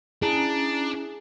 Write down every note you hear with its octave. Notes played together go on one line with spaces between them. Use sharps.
C#4 D4 E4 G#4 A#5